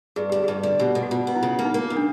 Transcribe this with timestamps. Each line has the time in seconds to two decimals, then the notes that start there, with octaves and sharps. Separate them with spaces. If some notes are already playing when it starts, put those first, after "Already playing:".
0.16 G2 G#4
0.30 D3 G4
0.44 G2 G#4
0.63 D3
0.79 B2 G4
0.95 B2
1.03 F#4
1.11 B2 F4
1.27 B3
1.35 E4
1.43 C#3 F4
1.59 A#3
1.65 D#4
1.74 A#3
1.90 C#3
1.97 D4